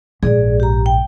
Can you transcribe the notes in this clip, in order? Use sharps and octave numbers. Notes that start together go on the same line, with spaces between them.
A#1 G#2 G#4 D5
G4 A#5
G5